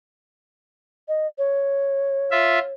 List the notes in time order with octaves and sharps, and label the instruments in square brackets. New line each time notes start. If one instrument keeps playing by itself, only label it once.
[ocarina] D#5
C#5
[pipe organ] F4 E5